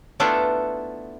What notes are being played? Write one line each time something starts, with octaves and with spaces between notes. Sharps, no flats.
A3 B3 D4 E4 F4 A4